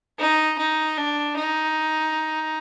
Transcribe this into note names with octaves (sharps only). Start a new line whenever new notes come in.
D#4
D#4
D4
D#4